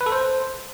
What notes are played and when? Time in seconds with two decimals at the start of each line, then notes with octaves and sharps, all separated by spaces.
0.01 B4
0.06 A4
0.12 C5